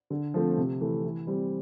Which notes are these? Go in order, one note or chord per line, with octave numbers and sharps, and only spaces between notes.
D3
F3 A3 C4
C3
E3 A3
E3
G3 C4